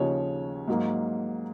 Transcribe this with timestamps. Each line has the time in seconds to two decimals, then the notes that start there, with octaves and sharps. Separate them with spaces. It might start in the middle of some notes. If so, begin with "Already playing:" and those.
Already playing: D#2 C#3 F3 C#5
0.68 G#2 F#3 A#3